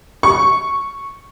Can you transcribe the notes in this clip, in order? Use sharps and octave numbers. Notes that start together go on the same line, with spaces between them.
C#6